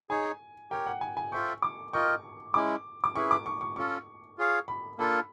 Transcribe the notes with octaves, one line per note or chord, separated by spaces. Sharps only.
D#4 G#4 C#5 G#5
G4 A#4 C#5 G5
F#5
G#5
G#5
F4 A4 C5 E5 G5 C#6
D6
F4 A#4 D#5 G5 C#6
G#3 C#4 E4 D6
D6
C#4 E4 G#4 B4 E5 C#6
D6
C#6
C#6
C#4 F4 A4 C#6
F4 G#4 C#5 F5
B5
A#3 D4 F4 A4 B5